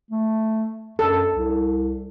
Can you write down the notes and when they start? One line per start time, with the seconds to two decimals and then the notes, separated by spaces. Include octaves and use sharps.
0.11 A3
0.99 F#2 A4
1.34 C2